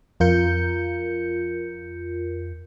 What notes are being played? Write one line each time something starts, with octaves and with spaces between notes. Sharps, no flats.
F2 F4 A#4 G6 C#7